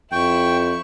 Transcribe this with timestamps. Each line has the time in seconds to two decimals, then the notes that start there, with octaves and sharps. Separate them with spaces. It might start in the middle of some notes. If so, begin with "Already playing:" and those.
0.12 F2 E4 G5 C#6